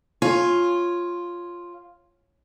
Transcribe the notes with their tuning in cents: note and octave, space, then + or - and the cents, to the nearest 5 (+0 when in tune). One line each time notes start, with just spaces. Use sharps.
F4 +0 C#5 -15 G#5 +0